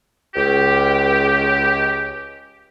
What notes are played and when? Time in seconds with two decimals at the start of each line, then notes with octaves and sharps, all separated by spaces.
0.34 C#2 G4